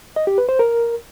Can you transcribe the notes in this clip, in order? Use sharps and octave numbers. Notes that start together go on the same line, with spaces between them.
D#5
G4
B4
C5
A#4